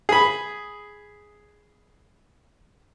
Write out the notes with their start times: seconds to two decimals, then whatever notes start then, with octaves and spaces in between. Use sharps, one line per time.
0.09 G#4 B5